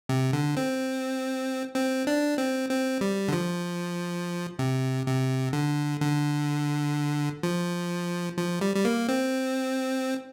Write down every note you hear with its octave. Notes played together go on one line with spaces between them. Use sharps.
C3
D3
C4
C4
D4
C4
C4
G3
D3
F3
C3
C3
D3
D3
F3
F3
G3
G3
A#3
C4